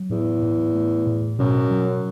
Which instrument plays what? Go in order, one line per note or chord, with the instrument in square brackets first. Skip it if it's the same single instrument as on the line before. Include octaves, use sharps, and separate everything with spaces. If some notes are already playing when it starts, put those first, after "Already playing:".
Already playing: [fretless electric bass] F#3
[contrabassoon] E2 [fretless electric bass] A2
[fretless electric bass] A2
A3
A2
[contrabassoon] F#2 [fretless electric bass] B2
[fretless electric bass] F#3